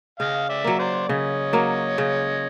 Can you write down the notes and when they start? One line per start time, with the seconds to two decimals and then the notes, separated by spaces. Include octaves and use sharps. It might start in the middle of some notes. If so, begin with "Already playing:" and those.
0.20 C#3 D#5 F5
0.49 D5 E5
0.64 F#3 A#3
0.78 C5 D5
1.08 C#3 C#5 D#5
1.53 F#3 A#3
1.98 C#3